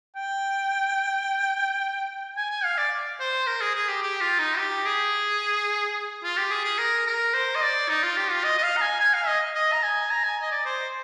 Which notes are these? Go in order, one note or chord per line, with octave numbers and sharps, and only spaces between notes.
G5
G#5
G#5
F5
D5
C5
A#4
G#4
G#4
G4
G4
F4
D#4
G4
G#4
F4
G4
G#4
G#4
A#4
A#4
C5
D#5
D5
D#4
F4
G4
F4
D#5
D#5
F5
A#5
G#5
G#5
F5
D#5
D#5
A#5
G#5
A#5
G#5
D#5
D5
C5